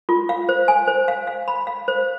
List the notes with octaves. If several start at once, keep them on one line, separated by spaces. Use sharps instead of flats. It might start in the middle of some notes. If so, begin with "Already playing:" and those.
F4
F5
C5
G#5
C5
F5
F5
B5
F5
C5